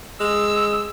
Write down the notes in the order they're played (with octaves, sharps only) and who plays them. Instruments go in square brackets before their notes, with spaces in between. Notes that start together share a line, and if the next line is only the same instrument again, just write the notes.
[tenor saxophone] G#3 [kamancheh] E6